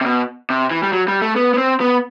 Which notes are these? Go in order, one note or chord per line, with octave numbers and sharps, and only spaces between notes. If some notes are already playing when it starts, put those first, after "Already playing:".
C3
B2
C3
E3
G3
F#3
G3
A3
B3
B3
C4
B3